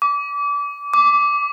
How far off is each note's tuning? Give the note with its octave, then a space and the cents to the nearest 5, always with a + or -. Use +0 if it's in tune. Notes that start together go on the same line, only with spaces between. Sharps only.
D6 -30
D6 -10